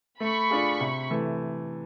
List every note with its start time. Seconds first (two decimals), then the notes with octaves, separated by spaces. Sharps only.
0.20 A3 B5 C#6
0.50 D4 F4 G#4
0.80 C3
1.11 E3 A3